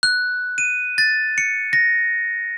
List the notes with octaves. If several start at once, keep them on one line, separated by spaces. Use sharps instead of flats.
F#6
D#7
A6
C#7
A#6